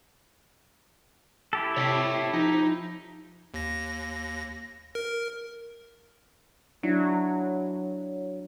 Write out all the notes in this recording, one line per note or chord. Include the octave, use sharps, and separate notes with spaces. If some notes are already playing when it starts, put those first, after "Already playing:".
E4 G4 A4
C3 C#5 E5 A5
F3 D#4
D#2 A#6
A#4
F#3 D4 E4